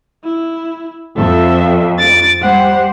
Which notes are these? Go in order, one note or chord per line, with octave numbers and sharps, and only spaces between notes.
E4
F2 A4 E5
A6 D7
G3 G4 C5 F#5